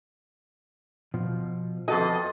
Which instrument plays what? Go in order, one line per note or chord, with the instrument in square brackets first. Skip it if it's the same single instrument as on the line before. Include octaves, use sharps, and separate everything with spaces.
[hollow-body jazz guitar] B2 F3
[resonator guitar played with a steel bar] F2 A4 D#5 [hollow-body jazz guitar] B3 F#4 G#5